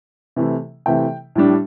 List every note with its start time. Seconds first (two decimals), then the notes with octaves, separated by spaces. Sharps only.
0.36 C3 E3 A3 E4
0.86 C3 E3 A3 E4 G5
1.35 A2 G3 D4